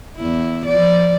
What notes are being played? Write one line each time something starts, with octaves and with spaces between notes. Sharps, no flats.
E2 E4
F3 D5